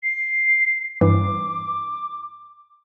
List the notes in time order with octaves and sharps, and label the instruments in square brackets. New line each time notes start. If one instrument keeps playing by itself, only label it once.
[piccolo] C7
[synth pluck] G2 E3 [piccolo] D6